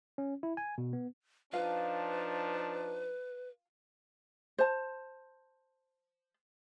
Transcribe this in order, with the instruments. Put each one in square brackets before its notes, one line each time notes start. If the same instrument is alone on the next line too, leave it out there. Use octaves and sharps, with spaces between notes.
[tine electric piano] C#4
E4
G#5
B2
B3
[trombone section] F3 D4 D#4 [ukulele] F4 F5 [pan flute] B4
[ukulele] C5 A5